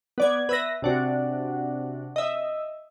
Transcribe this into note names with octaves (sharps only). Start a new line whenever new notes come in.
B3 D5 G#6
B4 E5 A#6
C3 D4 F#4
D#5 E5